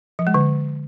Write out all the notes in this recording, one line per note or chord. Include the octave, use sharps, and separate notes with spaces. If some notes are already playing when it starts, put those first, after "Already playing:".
F3
G#3
D3